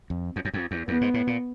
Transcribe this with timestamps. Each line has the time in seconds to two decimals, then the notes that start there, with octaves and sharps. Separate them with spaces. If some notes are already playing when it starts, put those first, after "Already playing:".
0.10 F2
0.36 F2
0.45 F#2
0.53 F2
0.71 E2
0.88 E2 B3
1.01 G#2
1.14 A2
1.27 A#2